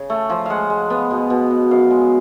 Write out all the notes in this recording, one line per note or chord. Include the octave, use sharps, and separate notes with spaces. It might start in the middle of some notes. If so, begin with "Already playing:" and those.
Already playing: C#3
A3
F3
G#3 F5 F#5
G#3
B3
B2
B2
B2
F#2 F5
G#3